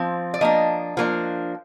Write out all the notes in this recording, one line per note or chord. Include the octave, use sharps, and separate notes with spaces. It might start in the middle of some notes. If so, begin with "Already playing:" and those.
Already playing: F3 C4
D5
F3 A#3 D4 D#5
F3 A#3 D4